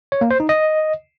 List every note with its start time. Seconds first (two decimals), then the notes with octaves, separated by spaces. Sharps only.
0.12 C#5
0.21 A#3
0.31 C5
0.40 D#4
0.49 D#5